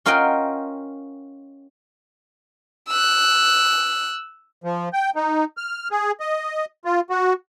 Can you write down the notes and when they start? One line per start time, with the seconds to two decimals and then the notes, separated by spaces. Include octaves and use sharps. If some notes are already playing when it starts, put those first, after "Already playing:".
0.06 C#4 F4 A#4 D#5 F#5 G5
2.88 E6 F#6
4.64 F3
4.93 G5
5.16 D#4
5.57 F6
5.91 G#4
6.20 D#5
6.85 F4
7.10 F#4